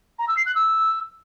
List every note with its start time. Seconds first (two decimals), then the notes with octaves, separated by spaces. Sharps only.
0.19 A#5
0.28 E6
0.37 C7
0.46 F#6
0.55 E6